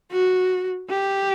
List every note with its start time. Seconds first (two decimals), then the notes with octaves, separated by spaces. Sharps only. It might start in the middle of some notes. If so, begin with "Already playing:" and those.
0.12 F#4
0.90 G4